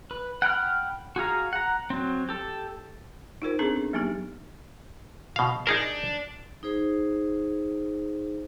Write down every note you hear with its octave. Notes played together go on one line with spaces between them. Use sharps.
B4
F#5 G5 B5 F6
F#4 G#4 F5 A#5
F#5 A#5
F#3 C4
G4 A4
D#4 F4 A#4 C5
B3 C4 D4 G#4 A4
D4
F#3 A#3 B3 D#4 G4
B2 F5
D4 D#4 G#4 A#4
D#4 G#4 C5